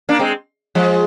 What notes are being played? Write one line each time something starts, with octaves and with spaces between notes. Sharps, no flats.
A#3 D4
G#3 C4
F3 G#3